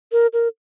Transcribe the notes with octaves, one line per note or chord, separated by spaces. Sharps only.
A#4
A#4